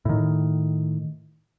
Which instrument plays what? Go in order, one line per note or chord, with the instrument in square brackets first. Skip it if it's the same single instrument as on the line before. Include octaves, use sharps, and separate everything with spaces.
[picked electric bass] A2 D#3